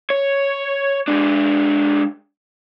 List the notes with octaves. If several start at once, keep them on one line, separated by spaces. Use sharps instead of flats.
C#5
G#3 D4